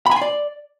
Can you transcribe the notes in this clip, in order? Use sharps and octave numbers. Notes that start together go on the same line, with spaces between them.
B5
G#5
C6
D5